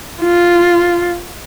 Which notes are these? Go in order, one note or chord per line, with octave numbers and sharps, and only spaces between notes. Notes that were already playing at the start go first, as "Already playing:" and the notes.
F4